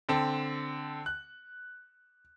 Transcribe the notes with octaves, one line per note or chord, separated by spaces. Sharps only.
D3 C4 A5
F#6